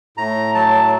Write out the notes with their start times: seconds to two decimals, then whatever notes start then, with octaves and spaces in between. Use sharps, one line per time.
0.17 A2 A#5
0.55 F#3 A5